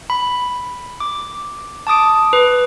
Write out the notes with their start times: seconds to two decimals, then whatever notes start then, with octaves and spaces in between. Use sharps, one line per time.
0.10 B5
1.00 D6
1.87 A5 D6 D#6 D7
2.33 B4